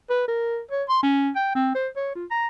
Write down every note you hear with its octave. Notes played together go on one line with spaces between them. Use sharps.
B4
A#4
C#5
C6
C#4
G5
C4
C5
C#5
F4
A#5